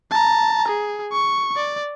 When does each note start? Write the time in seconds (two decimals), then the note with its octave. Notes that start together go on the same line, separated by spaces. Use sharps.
0.11 A5 A#5
0.68 G#4
1.12 C#6
1.56 D5